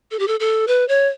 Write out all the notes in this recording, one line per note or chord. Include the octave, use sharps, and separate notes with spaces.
A4
G4
A4
A4
B4
C#5